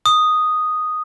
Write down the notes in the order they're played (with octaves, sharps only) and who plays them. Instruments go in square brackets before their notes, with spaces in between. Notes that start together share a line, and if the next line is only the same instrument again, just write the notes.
[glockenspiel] D#6